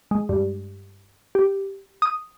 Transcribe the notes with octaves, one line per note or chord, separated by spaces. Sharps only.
G#3
G2
G4
D#6